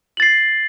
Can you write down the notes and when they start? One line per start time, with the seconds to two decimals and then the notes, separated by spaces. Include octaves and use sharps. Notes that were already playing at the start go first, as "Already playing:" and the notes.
0.17 F#7
0.20 A6
0.22 C7